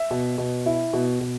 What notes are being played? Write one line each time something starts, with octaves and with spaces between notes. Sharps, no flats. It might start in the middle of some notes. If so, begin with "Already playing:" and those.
Already playing: E5
B2
B2
E4
B2
B2